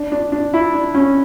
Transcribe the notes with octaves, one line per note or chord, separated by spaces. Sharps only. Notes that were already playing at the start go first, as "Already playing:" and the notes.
Already playing: D4
D4
D4
E4
D4
C#4